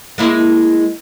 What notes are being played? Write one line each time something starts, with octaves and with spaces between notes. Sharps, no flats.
G#3 A#3 E4